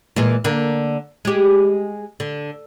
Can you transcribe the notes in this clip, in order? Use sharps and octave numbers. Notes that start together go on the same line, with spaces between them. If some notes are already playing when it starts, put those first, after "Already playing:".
A#2 E3 G#3
D3 A#3
G#3 G4
D3